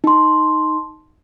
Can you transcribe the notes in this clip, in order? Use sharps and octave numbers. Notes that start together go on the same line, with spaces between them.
D#4 C6